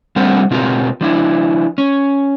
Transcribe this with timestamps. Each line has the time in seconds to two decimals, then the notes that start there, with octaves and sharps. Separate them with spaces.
0.16 G3 A3 C4 D4 A#4 F#5
0.51 B2 C4 F4 G4 A4 A#4
1.01 F3 D4 E4
1.78 C#4